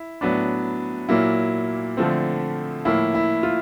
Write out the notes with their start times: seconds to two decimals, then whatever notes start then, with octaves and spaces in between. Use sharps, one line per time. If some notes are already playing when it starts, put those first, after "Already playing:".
Already playing: E4
0.21 A2 F#3 B3 D4
1.09 A#2 F#3 A#3 E4
1.97 D3 F3 A3 C4
2.85 A2 F3 A#3 E4
3.14 E4
3.43 F4